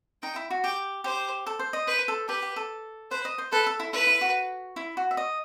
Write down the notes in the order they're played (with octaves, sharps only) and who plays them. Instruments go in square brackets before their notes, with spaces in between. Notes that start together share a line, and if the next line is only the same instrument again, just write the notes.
[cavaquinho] D#4 [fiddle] G5
[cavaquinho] E4
F#4
[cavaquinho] G4 [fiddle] G5
[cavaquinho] G4 [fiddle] C5
[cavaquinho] A4
C5
D#5
[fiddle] B4 [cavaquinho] C5
[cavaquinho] A4
[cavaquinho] G4 [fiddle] B4
[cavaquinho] G4
A4
[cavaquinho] B4 [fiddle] C5
[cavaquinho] D#5
C5
[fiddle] A4 [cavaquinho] B4
[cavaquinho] A4
E4
[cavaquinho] E4 [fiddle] B4
[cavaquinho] E4
F#4
E4
F#4
E5
D#5